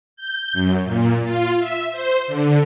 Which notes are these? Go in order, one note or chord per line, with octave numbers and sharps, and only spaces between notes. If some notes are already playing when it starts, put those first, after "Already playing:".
G6
F#2
A#2
F4
E5
C5
D3